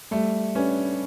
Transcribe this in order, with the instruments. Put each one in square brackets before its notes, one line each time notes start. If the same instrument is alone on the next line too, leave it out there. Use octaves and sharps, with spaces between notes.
[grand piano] G3 [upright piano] A3
[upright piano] C#4 [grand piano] D4 G4 B4